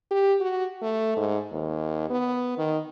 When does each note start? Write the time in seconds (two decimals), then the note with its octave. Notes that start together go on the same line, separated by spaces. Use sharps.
0.11 G4
0.41 F#4
0.82 A3
1.17 G#2
1.52 D#2
2.10 B3
2.58 D#3